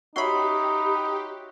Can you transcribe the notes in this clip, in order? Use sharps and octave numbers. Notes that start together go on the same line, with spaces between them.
D#4 F#4 G4 C#5 E5 B5 C6